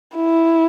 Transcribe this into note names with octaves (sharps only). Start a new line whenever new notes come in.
E4